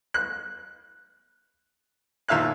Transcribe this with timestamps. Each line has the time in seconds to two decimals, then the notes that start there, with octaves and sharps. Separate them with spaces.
0.14 F#6
2.28 D#2 A#2 E5 F5 F#6